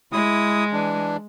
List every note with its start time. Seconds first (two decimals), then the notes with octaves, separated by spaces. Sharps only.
0.13 G#3 E4 D#6
0.73 E3 D4